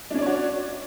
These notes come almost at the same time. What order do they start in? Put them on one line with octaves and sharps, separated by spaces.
D4 C#4 D5 C#5 F#4